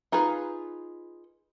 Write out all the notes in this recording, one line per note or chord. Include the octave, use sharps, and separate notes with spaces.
D#4 F4 G#4 B4